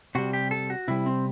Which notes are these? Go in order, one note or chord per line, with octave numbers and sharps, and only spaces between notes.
C3 G3 F#4
G4
A4
F#4
C3 G3 E4
C4